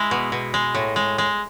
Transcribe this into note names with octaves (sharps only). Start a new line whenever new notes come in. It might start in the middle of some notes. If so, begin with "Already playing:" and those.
Already playing: G#3 E4
B2
B2
G#3
A2
G#3
G#3